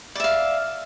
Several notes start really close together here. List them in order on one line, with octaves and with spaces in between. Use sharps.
D5 E5 F5